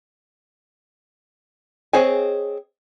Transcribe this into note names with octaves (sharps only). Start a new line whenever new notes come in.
C4 G#4 C#5 D#5 G#5